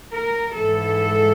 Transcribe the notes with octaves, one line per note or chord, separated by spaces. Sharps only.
A#4
G#2 E3 A4